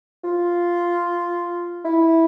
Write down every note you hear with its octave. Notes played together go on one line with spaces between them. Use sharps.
F4
E4